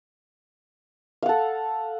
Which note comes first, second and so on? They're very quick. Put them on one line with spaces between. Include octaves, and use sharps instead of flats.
F5 F#5 A4